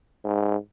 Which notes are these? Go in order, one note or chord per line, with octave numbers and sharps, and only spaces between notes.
G#2